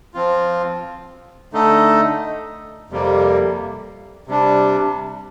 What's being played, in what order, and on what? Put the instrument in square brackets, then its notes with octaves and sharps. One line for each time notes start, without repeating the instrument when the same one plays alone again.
[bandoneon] F3 C4 F4
D3 A3 D#4 A4 D#5
F2 C3 G3 A#3
C3 G3 D4